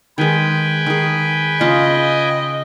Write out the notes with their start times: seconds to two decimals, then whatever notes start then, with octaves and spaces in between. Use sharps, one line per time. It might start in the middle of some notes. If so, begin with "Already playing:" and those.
0.18 D#3 G#3 B4 G5 G#5
0.86 D#3 G#4
1.61 C#3 F4 D#5 A5